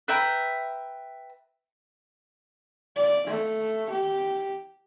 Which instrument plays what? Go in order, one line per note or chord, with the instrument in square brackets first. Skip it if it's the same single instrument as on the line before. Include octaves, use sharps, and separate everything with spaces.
[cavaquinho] B4 E5 G5 A#5
[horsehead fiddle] D5
A3
G4